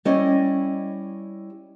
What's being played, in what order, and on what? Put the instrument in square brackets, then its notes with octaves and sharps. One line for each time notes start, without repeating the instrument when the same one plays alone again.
[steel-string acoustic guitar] G3 C#4 E4 D#5